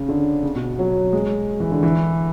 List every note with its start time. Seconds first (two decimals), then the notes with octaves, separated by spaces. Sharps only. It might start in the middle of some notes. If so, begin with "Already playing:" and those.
Already playing: C#3
0.09 D3
0.43 C#3
0.55 B2
0.79 F#3
1.13 G#3
1.60 E3
1.72 D3
1.83 E3